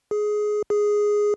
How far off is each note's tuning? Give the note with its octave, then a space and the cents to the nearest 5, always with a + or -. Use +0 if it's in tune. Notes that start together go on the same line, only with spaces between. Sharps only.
G#4 +15
G#4 +0